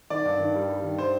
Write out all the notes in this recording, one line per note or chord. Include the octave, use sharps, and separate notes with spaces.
D#3 D5
G2
D#3
G3
G3
D#3
C5